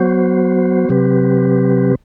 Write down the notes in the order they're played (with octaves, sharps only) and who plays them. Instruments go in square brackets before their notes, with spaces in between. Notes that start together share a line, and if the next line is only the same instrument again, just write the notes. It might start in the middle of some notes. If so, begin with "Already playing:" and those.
Already playing: [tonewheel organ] F#3 B3 F#4 C5
C3 F#3 C4 G4 B4